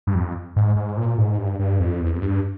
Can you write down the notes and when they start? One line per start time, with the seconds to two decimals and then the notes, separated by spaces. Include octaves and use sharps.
0.07 G2
0.15 F2
0.56 G#2
0.76 G#2
0.97 A#2
1.18 G#2
1.38 G2
1.59 G2
1.80 F2
2.00 E2
2.14 F2
2.22 G2